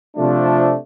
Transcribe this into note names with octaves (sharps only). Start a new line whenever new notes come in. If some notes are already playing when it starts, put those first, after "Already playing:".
C3 F3 A3 D4